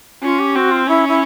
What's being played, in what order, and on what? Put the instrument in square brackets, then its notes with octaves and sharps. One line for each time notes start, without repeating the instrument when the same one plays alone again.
[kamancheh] C#4 [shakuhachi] F4
[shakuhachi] G4
[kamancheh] C4 [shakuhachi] F#4
[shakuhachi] F4
[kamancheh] C#4 [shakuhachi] E4
[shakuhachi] E4